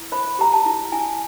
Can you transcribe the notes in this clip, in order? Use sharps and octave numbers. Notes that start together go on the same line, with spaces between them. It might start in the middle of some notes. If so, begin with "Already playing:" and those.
Already playing: E4
C5 B5
G4 A#5
A5
E4
E4 G#5